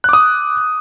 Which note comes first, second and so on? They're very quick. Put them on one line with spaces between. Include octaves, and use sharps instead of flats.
F#6 D6 D#6